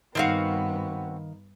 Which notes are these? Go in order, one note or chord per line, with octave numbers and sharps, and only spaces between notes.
G2 D#3 B3 C4 F4 F#4 F5